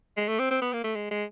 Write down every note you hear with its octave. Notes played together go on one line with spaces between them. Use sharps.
G#3
A3
C4
C4
B3
A#3
A3
G#3
G#3